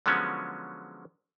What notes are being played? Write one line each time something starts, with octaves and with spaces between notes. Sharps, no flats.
D3 F3 F#3 G#3 B3 C#4